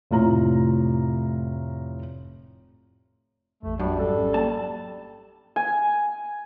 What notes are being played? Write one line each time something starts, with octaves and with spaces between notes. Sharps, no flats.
F1 A2 F4 A#5
A1 F2 A3
F#2 G3 D4
G#2 C#4 A4
A#3 G5 A5
G#5